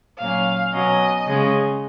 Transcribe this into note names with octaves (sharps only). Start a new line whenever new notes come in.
A#2 F#3 A#3 C#4 F5
B2 F#3 C#4 D#5
C#3 G#3 C#4